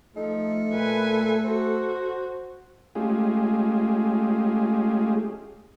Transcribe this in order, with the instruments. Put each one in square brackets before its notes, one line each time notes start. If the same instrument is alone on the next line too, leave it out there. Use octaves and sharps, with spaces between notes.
[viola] F3 [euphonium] A3 [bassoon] D#4 [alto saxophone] A4
[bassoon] A#2 [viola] B4 G#5
[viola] F#4 [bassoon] C5
[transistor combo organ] G#3 A3 C#4 F4 G4 G#4